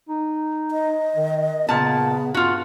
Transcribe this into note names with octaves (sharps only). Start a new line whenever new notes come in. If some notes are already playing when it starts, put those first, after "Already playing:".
D#4
D#5
D#3
A#2 C#3 B3 A5
G2 F4 F#4